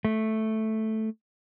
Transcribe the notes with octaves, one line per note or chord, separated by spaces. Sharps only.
A3